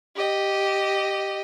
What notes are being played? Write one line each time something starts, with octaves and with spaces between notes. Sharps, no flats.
G4 D#5